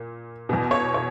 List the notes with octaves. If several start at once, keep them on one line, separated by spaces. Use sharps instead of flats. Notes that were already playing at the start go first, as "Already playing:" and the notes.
Already playing: A#2
E2 B2
C#5
C#5